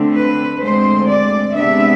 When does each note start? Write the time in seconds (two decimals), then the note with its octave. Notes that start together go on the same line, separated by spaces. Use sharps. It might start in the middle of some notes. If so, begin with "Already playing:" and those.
Already playing: D3 A3 C4
0.14 B4
0.59 D2 D3 G#3 C4 C5
1.06 D5
1.54 C3 G#3 B3 D4 E5